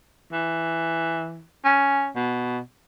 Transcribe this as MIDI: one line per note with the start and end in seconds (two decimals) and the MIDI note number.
0.33 1.44 52
1.65 2.10 61
2.16 2.59 47